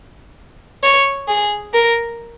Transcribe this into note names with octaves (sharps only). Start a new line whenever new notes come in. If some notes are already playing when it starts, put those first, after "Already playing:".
C#5
G#4
A#4